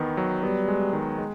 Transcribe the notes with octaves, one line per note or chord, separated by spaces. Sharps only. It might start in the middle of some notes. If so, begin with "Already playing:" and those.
Already playing: E2 D#3 B3
F#3
G3 B3
G#3
D#3
G#3